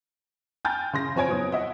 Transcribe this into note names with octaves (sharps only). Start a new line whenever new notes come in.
G5 G#5 A#5 F6 G6 A6
C#3 C6 A#6
F2 C4 C#5 G#5 G#6 D7
F#3 B3 D#6
D#5 E5 F#5